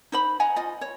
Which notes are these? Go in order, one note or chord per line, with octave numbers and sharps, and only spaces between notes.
D#4 C5 B5
D#5 F#5 G#5 A#5
F4 D#5
C#5